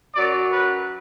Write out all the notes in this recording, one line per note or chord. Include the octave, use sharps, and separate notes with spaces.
F#2 F#3 D5
B4